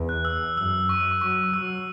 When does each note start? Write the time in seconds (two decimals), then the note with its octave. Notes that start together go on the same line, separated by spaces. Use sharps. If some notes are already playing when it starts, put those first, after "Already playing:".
Already playing: E2
0.09 F#6
0.25 E6
0.57 F#2 E6
0.89 C#6
1.21 F#3 C#6
1.54 F#3 E6